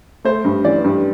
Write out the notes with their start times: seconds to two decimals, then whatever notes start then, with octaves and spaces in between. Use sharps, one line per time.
0.25 A3 C5
0.44 G2
0.64 E3 D5
0.84 G2